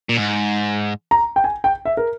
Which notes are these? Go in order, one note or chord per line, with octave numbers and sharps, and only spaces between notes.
A#2
G#2
A#5
G5
G#5
G5
E5
A#4